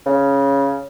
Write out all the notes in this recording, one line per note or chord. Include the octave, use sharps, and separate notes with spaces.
C#3